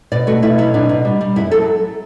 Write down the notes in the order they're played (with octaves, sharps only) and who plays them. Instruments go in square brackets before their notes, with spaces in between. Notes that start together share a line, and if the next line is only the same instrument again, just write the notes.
[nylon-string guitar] B2 D5
A3 F#4
B2 E4
F#3 E4
B2 D4
B2
G3
G3
F#2 E4
F#3 A4